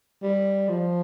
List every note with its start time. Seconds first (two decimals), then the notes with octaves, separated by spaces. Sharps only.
0.22 G3
0.69 F3